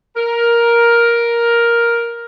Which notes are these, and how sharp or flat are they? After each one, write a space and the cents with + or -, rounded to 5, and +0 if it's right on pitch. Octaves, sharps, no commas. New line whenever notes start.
A#4 +10